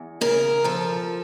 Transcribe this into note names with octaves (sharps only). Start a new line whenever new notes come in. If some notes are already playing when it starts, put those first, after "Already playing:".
Already playing: E2
C#3 A#4
F3 A4